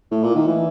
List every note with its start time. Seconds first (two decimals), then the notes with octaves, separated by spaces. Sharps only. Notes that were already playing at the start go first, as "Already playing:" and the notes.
0.12 A2
0.23 A#2
0.35 D#3
0.48 E3